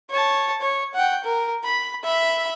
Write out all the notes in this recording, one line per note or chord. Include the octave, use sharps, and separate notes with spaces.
C#5 A5
C#5
F#5 G5
A#4
B5
E5 B5